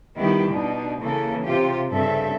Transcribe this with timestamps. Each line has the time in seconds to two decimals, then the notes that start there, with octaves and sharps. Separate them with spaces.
0.18 D#3 G3 B3 E4 G4
0.52 B2 D4 D#4
1.00 C#3 E3 A#3 A4
1.45 C3 F4 G4
1.92 G2 C#3 C4 A4 E5